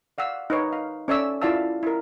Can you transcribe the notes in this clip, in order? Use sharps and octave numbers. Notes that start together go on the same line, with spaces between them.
D5 F5 F#5 E6
D#4 B4 C#5
F5
C#4 A4 C#5 D5 E5 E6
E4 F4 D5 F5 A5 E6
E4 A#4